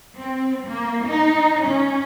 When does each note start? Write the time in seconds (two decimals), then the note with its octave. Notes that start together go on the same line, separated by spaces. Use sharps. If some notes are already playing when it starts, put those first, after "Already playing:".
0.17 C4
0.67 A#3
1.07 D#4
1.65 C#4